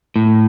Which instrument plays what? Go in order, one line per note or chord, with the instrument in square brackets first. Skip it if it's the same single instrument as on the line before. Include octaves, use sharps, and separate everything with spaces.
[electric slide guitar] A2